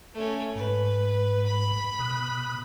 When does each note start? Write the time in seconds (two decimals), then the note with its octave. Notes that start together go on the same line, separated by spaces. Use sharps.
0.14 A3 C#4
0.56 G#2 B4
1.46 B5
1.99 B2 D#6 F#6